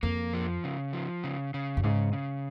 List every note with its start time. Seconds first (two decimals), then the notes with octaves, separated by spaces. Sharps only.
0.03 F2 A#3
0.33 F3
0.64 C#3
0.93 F3
1.24 C#3
1.54 C#3
1.77 F#2
1.84 G#2 C#3
2.13 C#3